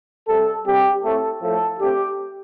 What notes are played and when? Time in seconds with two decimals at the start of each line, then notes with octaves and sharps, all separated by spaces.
0.27 C3 G3 C4 A4
0.65 D3 G3 C4 G4
1.03 A2 A3 C4 A4
1.41 A2 F3 A3 A4
1.79 D3 A3 C4 G4